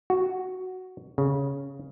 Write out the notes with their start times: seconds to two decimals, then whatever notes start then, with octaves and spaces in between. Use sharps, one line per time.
0.10 F#4
1.18 C#3